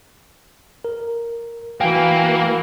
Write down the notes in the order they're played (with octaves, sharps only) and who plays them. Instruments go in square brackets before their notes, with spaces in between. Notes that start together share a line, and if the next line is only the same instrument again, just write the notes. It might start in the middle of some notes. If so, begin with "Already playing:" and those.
[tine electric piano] A#4
[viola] E3 F#4 [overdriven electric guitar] A#3 [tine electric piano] G5 G#5